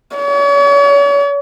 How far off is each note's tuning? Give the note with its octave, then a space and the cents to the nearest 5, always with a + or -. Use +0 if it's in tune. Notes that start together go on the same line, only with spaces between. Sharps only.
C#5 +40